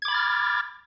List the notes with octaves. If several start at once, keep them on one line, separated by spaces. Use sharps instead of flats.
B5 D6 F6 G#6 A6